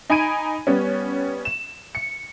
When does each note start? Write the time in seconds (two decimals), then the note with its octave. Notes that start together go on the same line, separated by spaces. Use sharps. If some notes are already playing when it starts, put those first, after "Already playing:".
0.10 D#4 G#5 B5 G#6 D7 D#7
0.67 G3 B3 C#4
1.45 E7
1.95 C#7